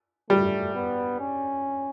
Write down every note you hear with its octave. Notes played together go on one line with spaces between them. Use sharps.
G3 A3
B3
C#4